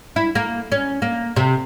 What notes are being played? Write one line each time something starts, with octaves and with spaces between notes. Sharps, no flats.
E4
A#3
C#4
A#3
C3